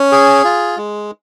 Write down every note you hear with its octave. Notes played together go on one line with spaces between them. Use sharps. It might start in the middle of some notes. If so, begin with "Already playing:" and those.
Already playing: C#4
G#4
F4
G#3